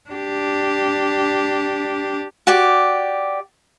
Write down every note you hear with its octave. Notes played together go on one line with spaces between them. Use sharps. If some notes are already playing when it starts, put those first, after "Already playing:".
D4 G4
F#4 G4 D5